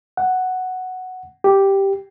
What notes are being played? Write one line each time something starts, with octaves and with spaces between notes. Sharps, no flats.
F#5
G4